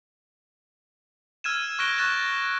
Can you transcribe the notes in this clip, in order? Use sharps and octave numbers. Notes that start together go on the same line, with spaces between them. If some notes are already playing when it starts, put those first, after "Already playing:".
E6 F6 G#6 D#7 E7
C#6 F#6 A#6 D7 G7
C#6 F#6 A6 E7